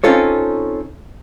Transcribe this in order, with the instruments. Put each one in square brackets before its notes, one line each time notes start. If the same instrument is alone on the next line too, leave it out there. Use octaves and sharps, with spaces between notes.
[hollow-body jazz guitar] C4 C#4 D#4 F4 A4 C#5